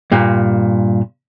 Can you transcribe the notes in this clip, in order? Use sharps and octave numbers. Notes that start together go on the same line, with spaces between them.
G2 A#2